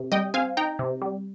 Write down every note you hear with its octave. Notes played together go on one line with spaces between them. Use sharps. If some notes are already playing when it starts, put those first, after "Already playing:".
Already playing: C3
G3 D#5 G5
C4 F5 G#5
D#4 G5 A#5
C3
G3